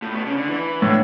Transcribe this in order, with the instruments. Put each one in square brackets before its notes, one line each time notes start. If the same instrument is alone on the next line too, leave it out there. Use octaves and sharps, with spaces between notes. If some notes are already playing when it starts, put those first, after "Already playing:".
[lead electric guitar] A2
B2
C#3
D3
E3
[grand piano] A2 [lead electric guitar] D3